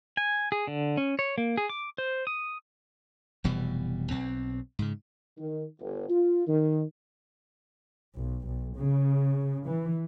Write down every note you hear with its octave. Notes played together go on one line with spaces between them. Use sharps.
G#5
G#4
D3
C#4
C#5
A#3
G#4
D6
C5
D#6
F1 B2 E3 G3
B1 C4
G#2 C#3
D#3
G1
F4
D#3
B1
B1
C#3
E3